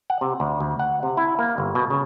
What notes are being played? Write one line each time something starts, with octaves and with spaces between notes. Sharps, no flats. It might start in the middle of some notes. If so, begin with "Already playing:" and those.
F#5
C3
D2
D2
F#5
C3
E4
A#3
G1
B2
C#3